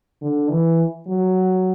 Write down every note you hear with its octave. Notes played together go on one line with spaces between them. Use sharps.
D3
E3
F#3